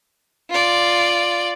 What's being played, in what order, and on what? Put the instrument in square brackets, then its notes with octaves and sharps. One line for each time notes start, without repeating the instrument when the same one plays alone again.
[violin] F4 D5